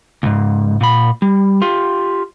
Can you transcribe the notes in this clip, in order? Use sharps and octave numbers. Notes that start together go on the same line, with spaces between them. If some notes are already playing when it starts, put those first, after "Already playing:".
C#2 G#2
A#2 B5
G3
F4 G4